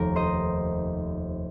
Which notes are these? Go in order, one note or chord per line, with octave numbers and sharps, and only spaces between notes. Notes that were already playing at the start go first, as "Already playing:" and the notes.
Already playing: F1 D#2 D#3 A#4
C5 D#5